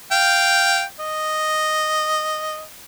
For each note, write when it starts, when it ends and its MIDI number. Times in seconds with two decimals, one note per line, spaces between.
0.11 0.82 77
0.11 0.82 79
1.00 2.61 75